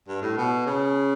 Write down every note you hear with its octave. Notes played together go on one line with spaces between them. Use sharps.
G2
A2
B2
C#3